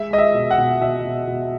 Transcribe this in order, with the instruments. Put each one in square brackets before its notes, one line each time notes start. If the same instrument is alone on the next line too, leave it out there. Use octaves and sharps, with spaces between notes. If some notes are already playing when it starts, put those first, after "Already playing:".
Already playing: [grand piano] G#3 E5
G#3 D#5
E5
B2
F#5
B2
B2 E5
B2
B2